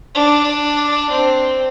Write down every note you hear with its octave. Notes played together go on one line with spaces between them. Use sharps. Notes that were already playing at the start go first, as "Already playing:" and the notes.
D4
C4